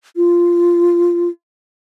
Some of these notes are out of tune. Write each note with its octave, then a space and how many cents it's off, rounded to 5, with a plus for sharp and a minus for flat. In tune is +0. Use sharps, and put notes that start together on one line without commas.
F4 -10